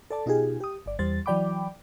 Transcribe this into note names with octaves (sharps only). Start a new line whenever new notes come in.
A4 D5 A5
B2 D#4 F4 G4 G#4
G4 D#6
G1 D5
E2 G3 C5 A6
E3 F#3 D5 G5 B5 D6